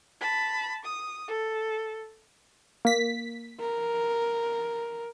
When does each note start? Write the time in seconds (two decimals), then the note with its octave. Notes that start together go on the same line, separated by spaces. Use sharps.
0.21 A5 B5
0.84 D#6
1.28 A4
2.85 A#3 B6
3.60 A#4